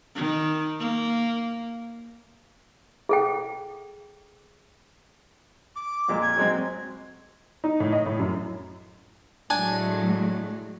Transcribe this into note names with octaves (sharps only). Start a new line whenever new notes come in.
D#3
A#3
G#4 A4 G5
D6
F2 A#2 G#3
G#6
F#3 G#3 C4
D#4
A2
D#5
A2
F#2
A2 F#3 G#3 D4 G#5